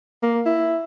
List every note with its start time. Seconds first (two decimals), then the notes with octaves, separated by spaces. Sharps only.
0.23 A#3
0.46 E4